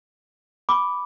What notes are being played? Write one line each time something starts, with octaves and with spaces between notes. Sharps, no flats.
B5 D6